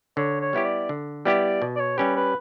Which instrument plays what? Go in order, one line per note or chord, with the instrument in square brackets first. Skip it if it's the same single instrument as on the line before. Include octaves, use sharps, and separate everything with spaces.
[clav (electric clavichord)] D3 [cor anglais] C#5
[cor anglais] C#5
[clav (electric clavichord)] G3 B3 E4 G4
[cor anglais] D5
[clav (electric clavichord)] D3
[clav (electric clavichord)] G3 B3 E4 G4 [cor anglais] D5
[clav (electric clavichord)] B2
[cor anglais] D5
C#5
[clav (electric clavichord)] G3 C#4 G4 [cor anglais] B4
[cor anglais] B4